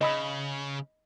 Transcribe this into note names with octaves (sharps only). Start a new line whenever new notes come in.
C#3 D#5 B5 E6